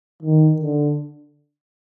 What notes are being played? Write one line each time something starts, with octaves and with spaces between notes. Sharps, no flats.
D#3
D3